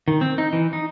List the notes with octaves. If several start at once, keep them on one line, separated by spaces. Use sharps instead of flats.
D#3
C4
D#4
E3
D#4